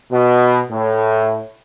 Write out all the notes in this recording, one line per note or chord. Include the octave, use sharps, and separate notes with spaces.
B2
A2